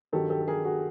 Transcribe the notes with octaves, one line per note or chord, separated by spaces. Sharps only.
G2 D#3 F#3 G4 A4
G4 A4
A4
G#4 A#4
F#4 G#4